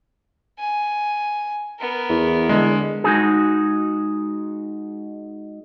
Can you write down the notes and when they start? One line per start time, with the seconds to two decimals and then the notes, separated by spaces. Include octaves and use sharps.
0.59 G#5
1.79 B3 A#4
2.10 E2
2.49 D3 G#3
3.04 G#3 D#4 F#4 G#4